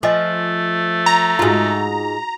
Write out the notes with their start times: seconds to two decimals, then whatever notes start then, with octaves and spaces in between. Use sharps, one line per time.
0.03 F3 A3 D#5 G#5 D6
1.06 A#5
1.39 G#2 D#4 F4 F#4